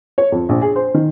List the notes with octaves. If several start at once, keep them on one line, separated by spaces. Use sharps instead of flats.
C#5
F2
A#1
G#4
C5
D#3